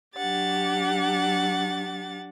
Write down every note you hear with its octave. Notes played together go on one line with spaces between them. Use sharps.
F#3 D4 G4 F#5 A6